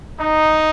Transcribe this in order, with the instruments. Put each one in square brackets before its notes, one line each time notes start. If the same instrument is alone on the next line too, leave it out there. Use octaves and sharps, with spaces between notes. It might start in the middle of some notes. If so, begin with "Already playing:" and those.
[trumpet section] D#4